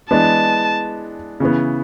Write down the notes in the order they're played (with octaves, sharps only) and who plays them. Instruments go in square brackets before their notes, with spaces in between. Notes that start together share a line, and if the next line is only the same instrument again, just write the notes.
[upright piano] E3 G#3 B3 D4 [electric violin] A5
[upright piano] C#3 E3 B3